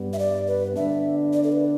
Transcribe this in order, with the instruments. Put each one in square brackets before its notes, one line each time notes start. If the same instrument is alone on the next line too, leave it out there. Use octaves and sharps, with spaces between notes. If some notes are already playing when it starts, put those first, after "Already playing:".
Already playing: [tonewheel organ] G2 G3 B3
[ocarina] E5
D5
B4
[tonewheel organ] D3 B3 D4 [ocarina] E5
[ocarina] D5
A4
B4